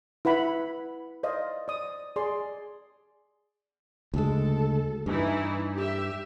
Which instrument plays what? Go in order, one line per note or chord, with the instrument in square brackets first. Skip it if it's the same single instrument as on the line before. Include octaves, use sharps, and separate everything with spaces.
[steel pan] E4 B4 F#5 B5
C5 D5 D#5 F5
D5 D#6
G#4 D5 C6
[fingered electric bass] D2 C#3 G#3 [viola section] A4
[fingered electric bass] G2 [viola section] E3 D#4 E4
[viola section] G4 E5